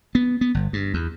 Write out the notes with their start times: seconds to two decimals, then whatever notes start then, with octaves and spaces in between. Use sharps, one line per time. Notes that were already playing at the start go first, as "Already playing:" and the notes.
0.15 B3
0.41 B3
0.54 G1
0.73 G2
0.94 E2